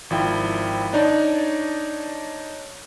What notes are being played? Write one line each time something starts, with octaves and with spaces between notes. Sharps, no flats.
G#1 F3 E4 G5
D4 D#4 C#5 D5 A5